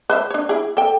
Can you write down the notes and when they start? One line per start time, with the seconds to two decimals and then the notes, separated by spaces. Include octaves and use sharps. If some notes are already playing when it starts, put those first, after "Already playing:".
0.10 B4 C5 E5
0.30 D4 C#5
0.49 E4 G#4
0.77 A4 G5